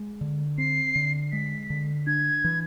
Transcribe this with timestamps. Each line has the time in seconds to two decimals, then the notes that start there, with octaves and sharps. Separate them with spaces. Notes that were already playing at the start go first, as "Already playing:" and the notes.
Already playing: G#3
0.21 D3
0.58 C4 C7
0.95 D3
1.32 G#3 B6
1.70 D3
2.07 D4 G#6
2.44 E3